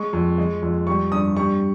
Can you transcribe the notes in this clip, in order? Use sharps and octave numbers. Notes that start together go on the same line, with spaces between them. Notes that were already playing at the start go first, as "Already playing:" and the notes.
Already playing: G#3 C#6
F2
G#3
F2
G3 C#6
G2 D#6
G3 C#6